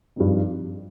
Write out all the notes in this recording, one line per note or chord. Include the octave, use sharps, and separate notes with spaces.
G2 F3 C4 D#4